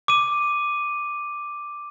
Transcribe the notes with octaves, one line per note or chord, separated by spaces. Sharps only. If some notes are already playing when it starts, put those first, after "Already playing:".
D6 D#7